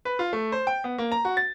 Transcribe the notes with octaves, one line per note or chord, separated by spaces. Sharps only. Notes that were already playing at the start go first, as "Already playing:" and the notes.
B4
F4
A3
C5
G5
B3
A#3
A#5
F#4
A6